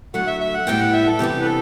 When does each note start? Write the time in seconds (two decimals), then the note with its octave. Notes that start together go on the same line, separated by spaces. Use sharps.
0.14 D3 F#3 A3 F#5
0.27 E5
0.40 E5
0.54 F#5
0.67 A2 G3 B3 E4 G5
0.80 F#5
0.93 E5
1.07 A4
1.19 C3 E3 B3 D4 G4
1.42 B4
1.45 A4